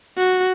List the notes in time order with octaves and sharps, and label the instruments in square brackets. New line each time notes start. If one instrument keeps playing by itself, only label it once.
[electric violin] F#4